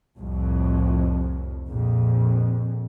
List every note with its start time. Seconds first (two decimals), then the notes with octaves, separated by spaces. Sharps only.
0.18 C2 F2 A2
1.68 A#1 F2